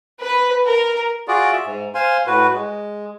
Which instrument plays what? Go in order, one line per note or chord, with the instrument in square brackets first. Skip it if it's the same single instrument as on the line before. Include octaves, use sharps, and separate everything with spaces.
[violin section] B4
A#4
[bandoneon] F4 F#4 G#4 D5
E5
G#2
C5 F5 G#5 C6
A2 F#4 B4
G#3